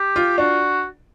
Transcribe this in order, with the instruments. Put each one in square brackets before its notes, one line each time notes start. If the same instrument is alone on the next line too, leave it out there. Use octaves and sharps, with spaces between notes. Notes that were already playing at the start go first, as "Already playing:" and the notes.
Already playing: [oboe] G4
[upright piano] F4
[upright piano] D4 [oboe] F#4